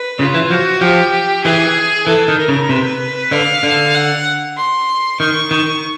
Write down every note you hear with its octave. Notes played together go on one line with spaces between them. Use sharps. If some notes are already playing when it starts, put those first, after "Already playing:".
Already playing: B4
C#3 F4
E3
F3 F#4
F3 G4
E3 G#4
E3 A4
D#3
A#4
C#3
C3 B4
D3 F5
D3
F#5
C6
D#3 C#6
D#3